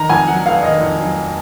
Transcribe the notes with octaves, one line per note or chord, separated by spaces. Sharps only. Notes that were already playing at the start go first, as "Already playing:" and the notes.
Already playing: D#3 A#5
F2 G#5
F#3 F#5
F1 F5
D#3 D#5
F2
F#3